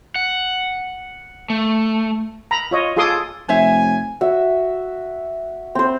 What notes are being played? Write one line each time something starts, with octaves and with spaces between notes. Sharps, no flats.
F#5
A3
A#5 B5
F4 C#5 D#5
F4 G#4 A4 C6 D6 D#6
F1 C5 C#5 E5 G#5
F#4 E5
C4 C5